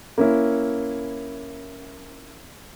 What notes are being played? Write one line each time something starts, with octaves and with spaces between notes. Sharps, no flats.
A#3 C#4 E4